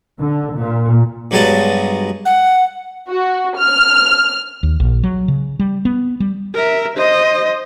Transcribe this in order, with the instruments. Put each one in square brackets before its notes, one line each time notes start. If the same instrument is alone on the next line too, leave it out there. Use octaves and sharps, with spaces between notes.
[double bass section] D3
A#2
[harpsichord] G2 F#3 G#3 B3 A5
[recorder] F#5
[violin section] F#4
F6
[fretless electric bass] D#2
A#1
F#3
C#3
G3
B3
G3
[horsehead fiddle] A#4 E5
C5 D#5